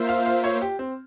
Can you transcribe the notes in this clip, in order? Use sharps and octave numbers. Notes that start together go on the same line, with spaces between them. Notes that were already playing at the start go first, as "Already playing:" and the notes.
Already playing: A#3 F4 C5 E5
F5
F5
C#5
G4
C4